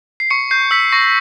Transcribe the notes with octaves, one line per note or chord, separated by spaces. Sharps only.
C7
C#6 C#7
G6 C7
E6 B6
C#6 A#6